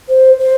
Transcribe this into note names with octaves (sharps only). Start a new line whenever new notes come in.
C5
C5